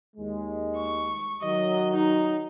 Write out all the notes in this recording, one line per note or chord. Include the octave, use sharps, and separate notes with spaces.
D#2 G#3
C#6
D#3 F#3 D#5
D#4